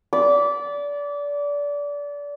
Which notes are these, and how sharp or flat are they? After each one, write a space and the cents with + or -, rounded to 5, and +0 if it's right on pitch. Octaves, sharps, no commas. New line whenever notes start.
D5 -25 B5 +0 D6 -20